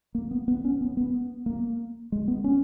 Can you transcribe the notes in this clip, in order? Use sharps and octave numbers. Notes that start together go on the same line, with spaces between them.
A#3
B3
B3
C#4
B3
B3
A#3
G#3
B3
C#4